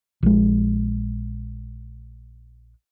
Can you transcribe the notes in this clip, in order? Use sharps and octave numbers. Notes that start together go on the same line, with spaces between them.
A#1 G#3